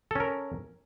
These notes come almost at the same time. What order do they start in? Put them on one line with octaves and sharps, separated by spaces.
A4 C#4 A#4